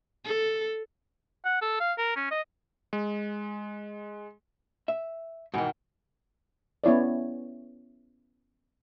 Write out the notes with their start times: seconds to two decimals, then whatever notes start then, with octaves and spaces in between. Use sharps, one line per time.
0.25 A4
1.45 F#5
1.62 A4
1.80 F5
1.98 A#4
2.16 C#4
2.31 D#5
2.93 G#3
4.88 E5
5.54 G#2 B2 D#3 E3
6.84 B3 C#4 E4 C#5 D5